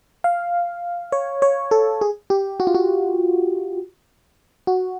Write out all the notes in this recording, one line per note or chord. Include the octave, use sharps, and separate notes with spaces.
F5
C#5
C#5
A4
G#4
G4
F#4
F4
F#4
F#4